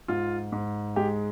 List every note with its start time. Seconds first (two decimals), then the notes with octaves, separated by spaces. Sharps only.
0.08 G#2 F4
0.52 G#2
0.96 G#3 G4